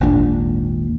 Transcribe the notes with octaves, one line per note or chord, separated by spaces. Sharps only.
G#1 D#2 A#2 D4